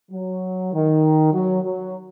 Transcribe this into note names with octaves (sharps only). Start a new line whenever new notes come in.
F#3
D#3
F#3
F#3